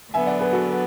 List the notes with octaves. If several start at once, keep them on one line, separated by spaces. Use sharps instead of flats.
D3 F#3 B3 E5 G#5
D5 F#5
G#4 B4
F#4 A4